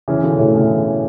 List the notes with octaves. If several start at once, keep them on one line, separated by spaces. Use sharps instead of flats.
C#3 E3
B2 D3
A2 C#3
C#3 E3